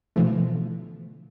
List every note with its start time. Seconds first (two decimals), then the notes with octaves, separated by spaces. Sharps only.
0.16 B2 D3 E3 F3 A3